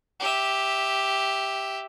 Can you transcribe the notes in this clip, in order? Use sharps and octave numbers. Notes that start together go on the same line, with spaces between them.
G4 E5